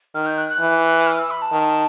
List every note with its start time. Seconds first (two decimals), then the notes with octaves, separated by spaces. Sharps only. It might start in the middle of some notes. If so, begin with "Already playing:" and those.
0.14 D#3 F6
0.26 G6
0.37 F#6
0.49 F#6
0.60 E3
1.06 F6
1.19 E6
1.30 B5
1.41 A5
1.52 D#3